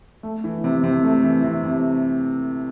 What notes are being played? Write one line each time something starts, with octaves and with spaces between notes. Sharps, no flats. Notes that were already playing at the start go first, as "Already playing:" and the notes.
A3
E3
C3
C3
A3
E3
C3
C3